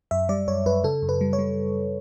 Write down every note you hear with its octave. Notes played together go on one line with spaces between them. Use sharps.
F#2 E5
G3 D5
F#2 C#5
F#2 B4
C#3 A4
F#2
B4
G3
C#5
G3